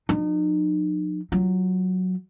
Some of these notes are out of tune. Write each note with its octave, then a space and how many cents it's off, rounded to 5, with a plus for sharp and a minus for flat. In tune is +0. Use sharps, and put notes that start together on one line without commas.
F3 +45 D#4 -35
F#3 +0 F4 +0